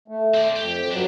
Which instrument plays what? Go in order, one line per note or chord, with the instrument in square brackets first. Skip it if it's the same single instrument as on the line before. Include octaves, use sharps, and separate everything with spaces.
[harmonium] A3
[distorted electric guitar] C4 D5
[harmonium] F2 [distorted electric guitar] G4
[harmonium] G2 F#3 [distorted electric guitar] D4 E4